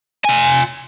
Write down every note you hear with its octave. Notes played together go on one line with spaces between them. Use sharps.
F4 G#5